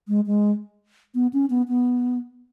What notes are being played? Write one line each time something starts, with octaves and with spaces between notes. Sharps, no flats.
G#3
G#3
B3
C#4
B3
B3